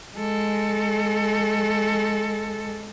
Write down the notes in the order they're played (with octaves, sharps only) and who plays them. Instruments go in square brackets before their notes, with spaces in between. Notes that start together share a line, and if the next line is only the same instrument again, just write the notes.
[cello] G#3 A4